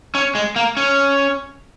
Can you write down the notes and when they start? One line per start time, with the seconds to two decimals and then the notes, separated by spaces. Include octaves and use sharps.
0.15 C#4
0.35 G#3
0.56 A#3
0.77 C#4